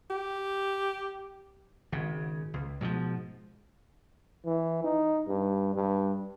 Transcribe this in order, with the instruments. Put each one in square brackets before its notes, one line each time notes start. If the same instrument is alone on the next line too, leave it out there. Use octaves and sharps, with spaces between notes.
[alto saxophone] G4
[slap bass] G#1 C#3
C#2
G#2 B2 D3 F3
[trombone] E3
D#4
G2
G2